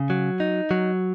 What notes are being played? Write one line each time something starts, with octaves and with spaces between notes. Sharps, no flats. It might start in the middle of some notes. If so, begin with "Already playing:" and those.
Already playing: C#3
F#3
D#4
F#3